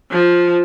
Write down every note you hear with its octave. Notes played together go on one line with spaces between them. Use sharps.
F3